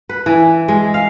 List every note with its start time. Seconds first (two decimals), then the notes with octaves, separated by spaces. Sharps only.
0.09 B4
0.26 E3
0.68 G#3
0.94 F5